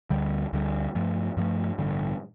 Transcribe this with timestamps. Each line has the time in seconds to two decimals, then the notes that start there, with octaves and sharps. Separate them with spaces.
0.10 D2 D3 G3
0.53 D2 D3 G3
0.95 G2 F3 A3
1.37 G2 F3 A3
1.78 A1 G2 D3